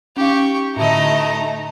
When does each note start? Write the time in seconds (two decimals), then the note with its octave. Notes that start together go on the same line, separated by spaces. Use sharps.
0.17 C#4 D#4 G4 F5 C#6
0.76 A2 D3 A3 D#4 E4 D#5 A#5